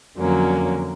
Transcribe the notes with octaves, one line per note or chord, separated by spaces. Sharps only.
F2 D3 F#3 A#3 C#4